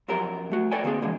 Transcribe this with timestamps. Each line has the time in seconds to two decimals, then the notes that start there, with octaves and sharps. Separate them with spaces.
0.08 F#2 F3 F#3 G4 A#4
0.52 A3 F#4
0.72 A4 B4 C#5 D5 G5 G#5
0.84 D3 A#3 C4 G#4
1.02 A#2 D3 E3 F3 G#3